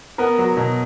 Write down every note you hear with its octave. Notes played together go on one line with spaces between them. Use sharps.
B3 A#4
F#3
B2